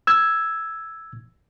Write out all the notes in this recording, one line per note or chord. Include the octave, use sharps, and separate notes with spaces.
E6 G#6